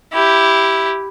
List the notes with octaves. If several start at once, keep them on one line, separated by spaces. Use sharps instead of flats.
E4 G4